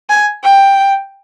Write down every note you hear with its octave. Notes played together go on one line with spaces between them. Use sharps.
G#5
G5